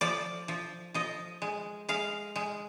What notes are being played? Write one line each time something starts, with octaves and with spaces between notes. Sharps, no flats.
F3 D5
F3
F3 D#5
G#3
G#3 F5
G#3